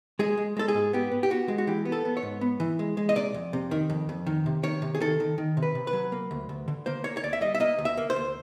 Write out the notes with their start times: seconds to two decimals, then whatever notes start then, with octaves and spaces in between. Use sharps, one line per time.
0.19 G#3 G#4
0.37 G#3
0.57 G#3 A4
0.68 G#4
0.74 G#2
0.93 B3 G4
1.12 B3
1.23 G4
1.30 B3 F#4
1.48 G#3
1.58 F#4
1.67 E3 G4
1.85 B3
1.92 A4
2.05 B3
2.17 C#5
2.23 G#2
2.41 B3
2.60 E3
2.79 G#3
2.97 G#3
3.09 D#5
3.16 C3 D5
3.34 F2
3.53 C3
3.71 D#3
3.90 F2
4.09 F2
4.26 D#3
4.46 C3
4.63 D#3 C#5
4.82 C3
4.95 G#4
5.00 D#3 A4
5.20 D#3
5.38 D#3
5.57 C3
5.63 B4
5.75 C3
5.87 B4
5.93 F#3
6.12 A#3
6.31 D2
6.49 D2
6.68 D3
6.86 A#3 C5
7.04 A#3 C#5
7.17 C#5
7.23 D2 D5
7.33 E5
7.41 G3 D#5
7.55 E5
7.60 A#3 D#5
7.79 D2
7.85 E5
7.97 A#3
8.10 C5
8.16 D2